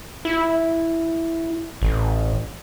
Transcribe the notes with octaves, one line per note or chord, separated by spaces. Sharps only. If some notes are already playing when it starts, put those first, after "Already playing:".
E4
A1